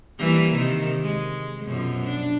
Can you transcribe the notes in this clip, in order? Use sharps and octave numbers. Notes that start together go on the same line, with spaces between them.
E3 G3 A#3
C3 D#3
G#3
F#2 B2 F3
D4